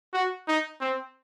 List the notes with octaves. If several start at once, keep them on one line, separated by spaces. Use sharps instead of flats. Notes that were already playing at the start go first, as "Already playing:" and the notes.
F#4
D#4
C4